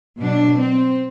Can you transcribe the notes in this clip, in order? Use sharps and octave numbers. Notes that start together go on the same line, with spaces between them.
B2 F#3 D4
C4